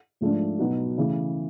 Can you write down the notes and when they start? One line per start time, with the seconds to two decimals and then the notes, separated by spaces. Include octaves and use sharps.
0.21 G#2 F3 A3 D4
0.59 B2 F#3 B3 D#4 F#4
0.97 C#3 E3 A3